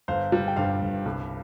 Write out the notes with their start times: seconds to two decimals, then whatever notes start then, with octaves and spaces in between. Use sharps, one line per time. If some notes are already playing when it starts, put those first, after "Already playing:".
0.08 G1 C5 F5
0.32 G3
0.48 G5
0.56 G2 C5 F5
0.82 G1
1.05 C2